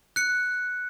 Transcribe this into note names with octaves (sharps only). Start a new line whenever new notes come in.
F#6 C#7